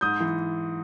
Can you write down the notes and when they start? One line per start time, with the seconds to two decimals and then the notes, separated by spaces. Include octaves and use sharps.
0.01 G#2 D#6 G6
0.20 E3